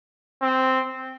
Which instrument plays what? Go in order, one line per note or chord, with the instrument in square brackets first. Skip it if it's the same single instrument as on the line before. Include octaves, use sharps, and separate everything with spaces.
[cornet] C4